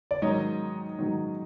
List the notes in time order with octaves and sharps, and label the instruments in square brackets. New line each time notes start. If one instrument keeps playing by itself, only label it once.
[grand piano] D5
G#2 D#3 F#3 C#5 D#5
G#2 D#3 F#3